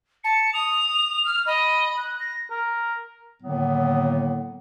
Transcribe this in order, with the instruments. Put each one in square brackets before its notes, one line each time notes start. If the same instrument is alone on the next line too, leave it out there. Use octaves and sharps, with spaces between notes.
[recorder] A5 [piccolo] C#7
[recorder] D#6 [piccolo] F7
[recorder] F6
[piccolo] D#5 [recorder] B5
[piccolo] F#6
A#6
[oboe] A#4
[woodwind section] A2 D3 D#3 F#3 A#3 B3